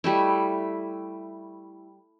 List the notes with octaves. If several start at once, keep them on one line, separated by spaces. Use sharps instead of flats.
G3 A3 E4